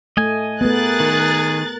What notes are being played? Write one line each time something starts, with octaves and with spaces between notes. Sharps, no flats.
A3 D#5 G#5
A3 B3 G#4 A#4 F#6 A6
D#3